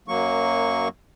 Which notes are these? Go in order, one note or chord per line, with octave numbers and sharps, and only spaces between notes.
F#2 F#3 A#3 C#6